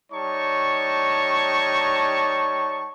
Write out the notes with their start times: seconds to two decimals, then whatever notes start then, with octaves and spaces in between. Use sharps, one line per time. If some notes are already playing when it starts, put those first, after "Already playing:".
0.13 G3 D#4 C#5 A5 C#6